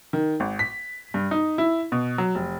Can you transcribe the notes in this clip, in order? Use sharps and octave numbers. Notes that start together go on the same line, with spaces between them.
D#3
G#1
B6
G2
D#4
E4
B2
F#3
F1